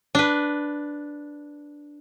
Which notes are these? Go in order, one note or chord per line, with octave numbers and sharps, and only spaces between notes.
D4 B4